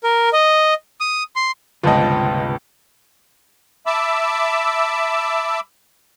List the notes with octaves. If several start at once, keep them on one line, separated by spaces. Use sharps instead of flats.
A#4
D#5
D#6
C6
G1 C#2 C3 F4 B4 D#5 A5
E5 A5 B5 D6 E6